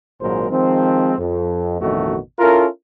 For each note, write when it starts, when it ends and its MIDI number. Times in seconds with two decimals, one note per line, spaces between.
0.21 0.49 32
0.21 0.49 46
0.21 0.49 54
0.21 0.49 56
0.21 0.49 70
0.21 0.49 72
0.50 1.15 51
0.50 1.15 53
0.50 1.15 56
0.50 1.15 60
1.18 1.80 41
1.81 2.17 33
1.81 2.17 41
1.81 2.17 47
1.81 2.17 51
1.81 2.17 57
1.81 2.17 66
2.39 2.67 61
2.39 2.67 64
2.39 2.67 65
2.39 2.67 69
2.39 2.67 70